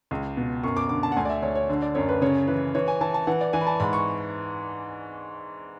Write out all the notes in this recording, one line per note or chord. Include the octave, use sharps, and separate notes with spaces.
C#2
B2
F#2 C#6
D6
D3 D6
A5
F#5
D2 G#5
D5
E5
D2 C#5
C#5
D3
D5
F#2 C#5
B4
C#3 C#5
E3 B4
E3 C#5
G#5
E3 A5
A5
E3 F#5
D5
E3 G#5
B5
A5
G#2 B5
C#6